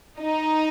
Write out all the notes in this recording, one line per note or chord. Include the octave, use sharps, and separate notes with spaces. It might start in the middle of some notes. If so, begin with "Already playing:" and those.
D#4